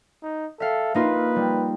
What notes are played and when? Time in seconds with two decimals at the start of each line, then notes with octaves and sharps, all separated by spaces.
0.23 D#4
0.60 A4 E5 F5
0.95 A#3 D#4 F4 B4
1.36 G3